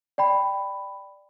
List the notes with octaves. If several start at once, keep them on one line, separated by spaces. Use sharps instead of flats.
D5 G5 B5